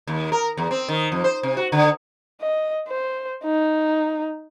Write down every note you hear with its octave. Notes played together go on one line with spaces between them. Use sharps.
D#2
A#4
E2
C4
D#3
F2
C5
C3
F#4
D3
D#5
C5
D#4